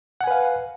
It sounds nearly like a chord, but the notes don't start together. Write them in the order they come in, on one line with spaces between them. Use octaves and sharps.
F#5 G#5 B4 F5